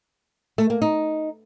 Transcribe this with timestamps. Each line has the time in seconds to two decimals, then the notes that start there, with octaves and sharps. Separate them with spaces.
0.58 A3
0.70 A#3
0.82 D#4